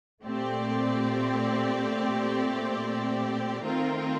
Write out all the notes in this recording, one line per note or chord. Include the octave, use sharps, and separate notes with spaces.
A#2 A3 C4 G4 D5
D#3 A3 C4 F4 A#4